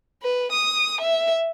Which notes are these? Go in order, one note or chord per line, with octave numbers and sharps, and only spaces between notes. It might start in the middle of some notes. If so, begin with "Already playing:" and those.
B4
D#6
E5